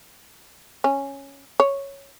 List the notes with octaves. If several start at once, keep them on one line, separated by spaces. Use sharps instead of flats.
C#4
C#5